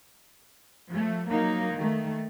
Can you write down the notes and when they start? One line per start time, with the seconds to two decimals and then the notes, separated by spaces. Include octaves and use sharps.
0.89 F3 A3
1.29 F#3 A#3 D#4
1.75 D#3 A3